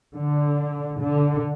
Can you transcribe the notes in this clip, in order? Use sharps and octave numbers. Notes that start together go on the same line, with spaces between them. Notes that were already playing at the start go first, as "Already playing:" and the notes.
D3
D3